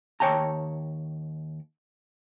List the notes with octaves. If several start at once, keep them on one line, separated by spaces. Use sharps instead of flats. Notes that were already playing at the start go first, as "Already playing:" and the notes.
D#2 C#5 G5 A5 A#5